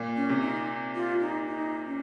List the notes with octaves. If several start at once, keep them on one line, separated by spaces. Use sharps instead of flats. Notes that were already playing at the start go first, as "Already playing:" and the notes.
Already playing: A#2
C#4
C3
D#4
F4
D#4
D#4
C#4